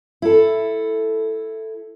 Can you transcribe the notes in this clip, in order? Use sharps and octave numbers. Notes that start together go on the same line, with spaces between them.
E4 A4